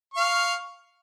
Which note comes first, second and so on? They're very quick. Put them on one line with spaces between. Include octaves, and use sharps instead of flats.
C#6 F5 F6